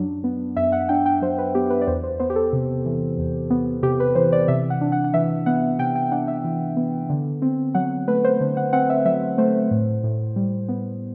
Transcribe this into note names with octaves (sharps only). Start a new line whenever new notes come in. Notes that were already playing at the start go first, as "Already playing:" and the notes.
Already playing: F#2 F#3 D4
B3
F#2 E5
F#5
D4 G5
G5
F#3 C5
B4
B3 G4
B4
D5
E2 C5
C5
B3 C5
G4
A4
C3
E3
E2
B3
C3 G4
B4
E3 C5
D5
C3 E5
F#5
D4
F#5
F#5
E3 E5
B3 F#5
C3 G5
G5
D4 F#5
E5
E3
B3
D3
C4
F#3 F#5
A3 B4
C5
D3
F#5
C4 F#5
E5
F#3 E5
A3 C5
A2
A2
G3
B3